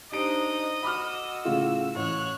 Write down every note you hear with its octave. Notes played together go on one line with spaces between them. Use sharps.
D4 D#4 G4 C5 D#5 D7
F#4 B5 D6 E6 F6
A2 C#3 F4
A1 C#5 F#6